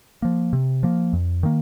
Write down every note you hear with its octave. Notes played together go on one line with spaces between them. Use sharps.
F3 A#3
C3
F3 A#3
F2
D#3 A#3